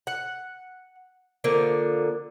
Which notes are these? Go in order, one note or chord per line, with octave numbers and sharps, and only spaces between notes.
F#5
D3 F3 A#3